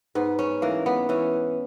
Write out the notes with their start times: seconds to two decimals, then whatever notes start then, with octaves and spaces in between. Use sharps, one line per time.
0.15 G#2 B3
0.39 C#4
0.62 E3 A#3
0.86 B3
1.09 E3 C#4